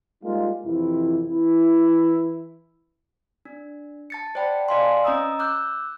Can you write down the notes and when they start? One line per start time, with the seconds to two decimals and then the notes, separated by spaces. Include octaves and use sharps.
0.24 G3 G#3 A#3 D#4 F4
0.65 F2 C3 E3 E4
1.29 E3 E4
3.45 D4
4.10 A5 A6 C#7
4.35 C5 D5 F#5 G5 A5 B5
4.69 C5 D5 D#5 F5 G#5 C6
5.04 C#4 D#5 A#5 D#6 E6
5.39 D6 E6 F#6 G6